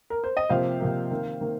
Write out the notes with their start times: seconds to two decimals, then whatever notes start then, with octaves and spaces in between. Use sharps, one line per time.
0.10 A#4
0.24 C5
0.37 D#5
0.49 C3 F3 A#3 C5 F5
0.80 C3 F3 A#3
1.10 D#3 A#3
1.41 D#3 A#3